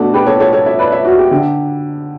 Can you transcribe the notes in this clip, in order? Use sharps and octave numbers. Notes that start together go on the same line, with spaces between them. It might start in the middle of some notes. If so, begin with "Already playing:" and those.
Already playing: B2 A3 D4 F#4 A4
G4 B4
A4 C#5
A4 C#5
A4 C#5
C#5 E5
B4 D5
C#5 E5
F#4
G4
D3 G4